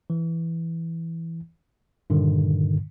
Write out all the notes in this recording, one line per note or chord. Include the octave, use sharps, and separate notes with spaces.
E3
G2 A#2 D3 D#3